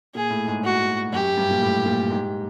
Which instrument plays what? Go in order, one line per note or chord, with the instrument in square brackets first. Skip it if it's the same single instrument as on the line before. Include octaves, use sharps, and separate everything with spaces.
[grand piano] A#2 [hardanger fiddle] G#4
[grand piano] A2
G#2
[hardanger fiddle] F#4
[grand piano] F#2 [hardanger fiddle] G4
[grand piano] G2
A#2
A2
A#2
G#2